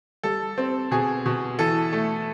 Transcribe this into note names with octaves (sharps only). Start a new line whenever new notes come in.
G3 A4
C4
B2 G#4
B2
E3 A4
A3